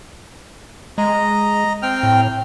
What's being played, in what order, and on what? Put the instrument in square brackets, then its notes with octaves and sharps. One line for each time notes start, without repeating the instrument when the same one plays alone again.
[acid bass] G#3 [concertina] D#5 A#5
[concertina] C4 G5 F6
[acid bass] A2